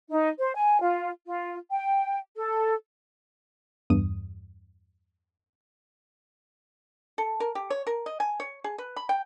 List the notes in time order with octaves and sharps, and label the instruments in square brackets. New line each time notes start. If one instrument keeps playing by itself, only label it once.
[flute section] D#4
C5
G#5
F4
F4
G5
A4
[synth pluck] E2 G2 D#6
[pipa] A4
A#4
G4
C#5
A#4
D#5
G#5
C#5
G#4
B4
B5
G5